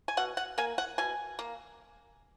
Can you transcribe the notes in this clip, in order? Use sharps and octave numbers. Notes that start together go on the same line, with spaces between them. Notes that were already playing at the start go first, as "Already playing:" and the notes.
G#5
B2 F#5
F#5
A#3 G#5
F#5
B2 G#5
A#3